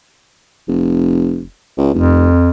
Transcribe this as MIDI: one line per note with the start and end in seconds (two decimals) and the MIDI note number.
0.68 1.44 29
1.78 1.94 37
1.94 2.29 29
1.94 2.50 41